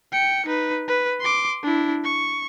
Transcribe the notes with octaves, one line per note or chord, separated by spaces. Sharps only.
G5 C#7
D#4 B4
B4
C6 D6
D4 E4
C#6